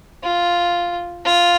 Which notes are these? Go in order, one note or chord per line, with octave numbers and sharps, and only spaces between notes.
F4
F4